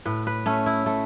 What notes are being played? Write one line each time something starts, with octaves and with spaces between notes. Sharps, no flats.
A2 B4
B4
A3 C#4
E4
A3